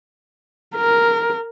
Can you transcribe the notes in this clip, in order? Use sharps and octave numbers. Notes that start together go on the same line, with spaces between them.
A#4